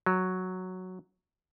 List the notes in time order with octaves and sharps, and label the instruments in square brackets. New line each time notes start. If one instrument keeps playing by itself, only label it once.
[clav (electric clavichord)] F#3